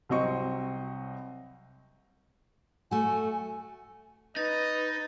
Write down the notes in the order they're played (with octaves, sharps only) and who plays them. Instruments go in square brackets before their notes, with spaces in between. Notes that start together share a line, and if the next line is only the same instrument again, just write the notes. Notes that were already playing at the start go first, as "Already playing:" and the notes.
[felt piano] C2 F#3 C4 D#5 C#6
[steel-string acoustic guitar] A3 F#4 [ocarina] G#5
[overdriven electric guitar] D#4 [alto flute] B4 [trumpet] D#5 [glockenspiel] A6